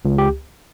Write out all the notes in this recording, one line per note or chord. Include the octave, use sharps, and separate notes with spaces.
C#2
G4